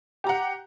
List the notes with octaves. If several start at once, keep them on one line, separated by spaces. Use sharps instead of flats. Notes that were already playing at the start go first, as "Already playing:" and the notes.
G4 F#5 A#5